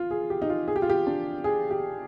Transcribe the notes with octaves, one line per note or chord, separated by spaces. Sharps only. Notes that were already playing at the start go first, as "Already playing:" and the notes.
Already playing: F4
G#4
G4
D#4
F4
G#4
G4
F4
G4
D4
G#4
G4